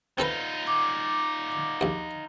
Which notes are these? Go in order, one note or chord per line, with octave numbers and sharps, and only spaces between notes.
C4 D#4 F4 A4 B4
D6
A#1 D#2